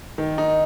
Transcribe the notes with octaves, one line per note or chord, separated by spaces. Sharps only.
D#3
D#4